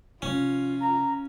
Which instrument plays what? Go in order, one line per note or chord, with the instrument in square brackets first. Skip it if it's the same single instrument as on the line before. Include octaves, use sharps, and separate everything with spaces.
[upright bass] C3 F3 [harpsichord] C#4 [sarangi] F4
[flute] A#5